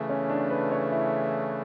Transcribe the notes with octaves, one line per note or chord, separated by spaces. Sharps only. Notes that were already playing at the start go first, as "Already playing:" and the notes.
Already playing: C#3 E3 A3
C#4
D4
B4
C#5
E4